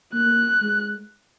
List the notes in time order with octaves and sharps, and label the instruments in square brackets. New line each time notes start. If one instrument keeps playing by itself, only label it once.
[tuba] A#3 [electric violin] F#6
[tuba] G#3